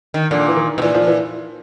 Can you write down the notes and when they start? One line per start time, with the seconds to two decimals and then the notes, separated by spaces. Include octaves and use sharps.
0.14 D#3
0.31 A#2 D3
0.48 E3
0.56 D#3
0.78 B2
0.82 A#2 E3
0.94 F3
1.07 E3